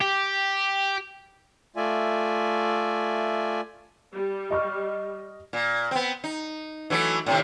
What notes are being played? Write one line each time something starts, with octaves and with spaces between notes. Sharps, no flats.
G4
A3 F4 D5 E5 G#5
G3
D#5 C#6 F6
A#2
B3 C4
D#4
E3 F#3 A3
A2 C3 D#3